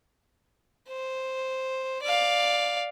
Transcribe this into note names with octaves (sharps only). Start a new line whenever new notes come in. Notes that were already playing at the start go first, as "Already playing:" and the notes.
C5
D5 F5